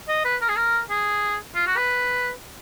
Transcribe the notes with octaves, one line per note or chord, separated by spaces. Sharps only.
D#5
B4
A#4
G#4
A#4
G#4
F4
F#4
B4